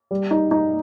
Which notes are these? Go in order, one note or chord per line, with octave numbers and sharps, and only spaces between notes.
G3
D#4
D#4